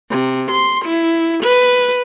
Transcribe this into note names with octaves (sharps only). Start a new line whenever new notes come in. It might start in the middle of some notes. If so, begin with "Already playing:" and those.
C3
C6
E4
B4